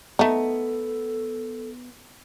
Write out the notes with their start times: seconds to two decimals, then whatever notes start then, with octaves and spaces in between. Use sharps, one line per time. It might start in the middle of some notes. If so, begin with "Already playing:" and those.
0.19 A3 B3 D#4 A4